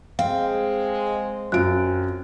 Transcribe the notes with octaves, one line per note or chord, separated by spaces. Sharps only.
G#3 C4 F5
F#2 F4 F#6 D7